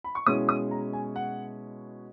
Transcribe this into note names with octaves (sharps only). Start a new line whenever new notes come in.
B5
C#6
B2 G#3 C#4 E4 D#6
D#6
A#5
G#5
F#5